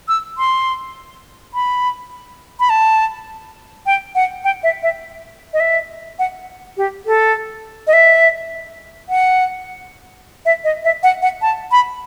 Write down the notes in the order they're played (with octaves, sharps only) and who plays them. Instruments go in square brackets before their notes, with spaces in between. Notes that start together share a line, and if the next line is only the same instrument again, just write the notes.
[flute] E6
C6
B5
B5
A5
G5
F#5
G5
E5
E5
D#5
E5
F#5
G4
A4
D#5
E5
F#5
E5
D#5
E5
F#5
F#5
A5
B5